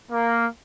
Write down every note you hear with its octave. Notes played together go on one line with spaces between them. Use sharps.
A#3